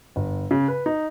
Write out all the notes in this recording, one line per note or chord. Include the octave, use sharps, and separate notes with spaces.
G1
C#3
B4
D#4